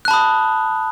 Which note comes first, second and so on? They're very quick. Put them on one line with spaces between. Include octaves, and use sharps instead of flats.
F#6 A5 B5 D#6